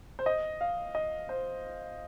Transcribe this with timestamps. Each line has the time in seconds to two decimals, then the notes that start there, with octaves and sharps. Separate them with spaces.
0.19 C5
0.26 D#5
0.61 F5
0.95 D#5
1.29 C5